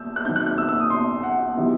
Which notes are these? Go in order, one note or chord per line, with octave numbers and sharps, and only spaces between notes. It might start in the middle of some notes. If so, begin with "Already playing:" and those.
Already playing: E6 G6
F#6
D#3 F#3 C4 D#4 G6
F#6
F#6
E6
E6
D#6
C6
F#5
C3 D#3 F#3 B3 E4